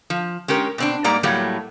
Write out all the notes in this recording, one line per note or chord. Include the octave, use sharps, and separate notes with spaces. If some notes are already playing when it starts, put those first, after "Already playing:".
F3
G#3 C#4 G4 A#4
B2 C4 D4
G#2 G3 A#3 D5 A#5
A2 F#3 G3 A3 A#3